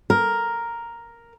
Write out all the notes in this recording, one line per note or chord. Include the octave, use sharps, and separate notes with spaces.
A#4